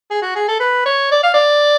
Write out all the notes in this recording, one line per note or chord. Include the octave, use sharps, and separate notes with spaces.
G#4
F#4
G#4
A4
B4
C#5
D5
F5
D5